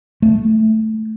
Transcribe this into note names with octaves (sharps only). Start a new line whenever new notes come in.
A3